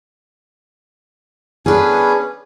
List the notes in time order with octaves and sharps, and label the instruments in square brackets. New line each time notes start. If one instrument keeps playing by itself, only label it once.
[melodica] B3 C#4 D4 [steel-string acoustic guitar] G#4 B4